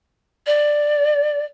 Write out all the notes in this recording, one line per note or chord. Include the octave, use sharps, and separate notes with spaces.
D5